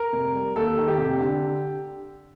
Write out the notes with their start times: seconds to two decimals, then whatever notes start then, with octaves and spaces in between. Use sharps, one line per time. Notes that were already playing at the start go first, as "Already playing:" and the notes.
Already playing: A#4
0.13 F1
0.35 G3
0.56 D#2 A4
0.78 D#3
0.88 G4
0.98 F1
1.21 D3